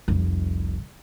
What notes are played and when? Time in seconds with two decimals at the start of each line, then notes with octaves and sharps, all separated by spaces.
0.08 F1 C2